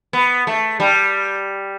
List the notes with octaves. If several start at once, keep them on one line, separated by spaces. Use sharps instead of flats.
B3
A3
G3